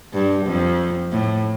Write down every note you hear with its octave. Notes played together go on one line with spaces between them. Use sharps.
G2
F2
A2